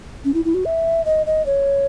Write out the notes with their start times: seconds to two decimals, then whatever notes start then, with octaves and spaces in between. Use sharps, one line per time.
0.25 C#4
0.34 E4
0.45 E4
0.54 F#4
0.65 E5
1.05 D#5
1.26 D#5
1.46 C#5